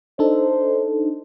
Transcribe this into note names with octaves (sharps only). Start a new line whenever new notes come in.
D4 D#4 A4 C5